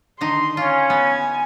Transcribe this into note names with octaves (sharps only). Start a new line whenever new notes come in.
D3 D#3 D#4 C6
C#4 F4
B3 G#5